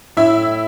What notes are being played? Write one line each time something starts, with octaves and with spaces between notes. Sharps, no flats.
A2 E4 E5